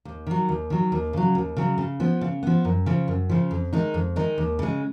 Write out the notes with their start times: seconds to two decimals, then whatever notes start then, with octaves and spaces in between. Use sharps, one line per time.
0.05 D#2
0.27 D#3 F#3
0.49 D#2
0.70 D#3 F#3
0.92 D#2
1.13 C#3 F#3
1.35 D#2
1.56 C#3 F#3
1.78 C#3
2.00 F3 B3
2.21 C#3
2.43 F3 B3
2.65 F#2
2.86 C#3 F3
3.08 F#2
3.29 C#3 F3
3.51 F2
3.73 D#3 G#3 D#4
3.94 F2
4.16 D#3 G#3 D#4
4.38 D#2
4.59 C#3 G#3